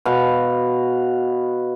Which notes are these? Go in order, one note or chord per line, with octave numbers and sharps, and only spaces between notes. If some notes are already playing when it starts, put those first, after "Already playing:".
B2 B4 F5